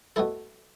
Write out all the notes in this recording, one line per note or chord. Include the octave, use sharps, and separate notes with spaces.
B2 A3 E4 A4